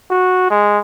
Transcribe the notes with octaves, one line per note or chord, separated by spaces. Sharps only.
F#4
G#3